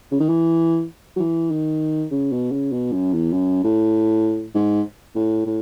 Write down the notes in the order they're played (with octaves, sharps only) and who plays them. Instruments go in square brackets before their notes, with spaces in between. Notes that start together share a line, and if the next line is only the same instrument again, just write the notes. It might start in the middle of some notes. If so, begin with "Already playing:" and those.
[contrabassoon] C#3
D#3
E3
F#3
E3
D#3
C#3
B2
C#3
B2
F#2
E2
F#2
A2
G#2
A2
A2